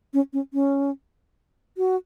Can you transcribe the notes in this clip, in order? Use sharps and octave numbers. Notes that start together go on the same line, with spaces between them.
C#4
C#4
C#4
F#4